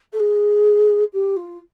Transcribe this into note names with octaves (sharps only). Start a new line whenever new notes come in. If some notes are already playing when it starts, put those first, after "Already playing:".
A4
G#4
G4
F4